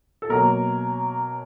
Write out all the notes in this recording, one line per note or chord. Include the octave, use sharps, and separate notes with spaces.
A4
B2 F#3 A#3 A#4